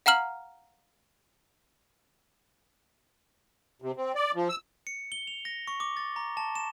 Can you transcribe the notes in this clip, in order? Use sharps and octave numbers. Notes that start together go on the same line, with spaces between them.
F5 F#5 A#5 F6 F#7
C3
C4
D5
F3
E6
C#7
G7
F7
A#6
C#6
D6
A6
A#5
A5
E7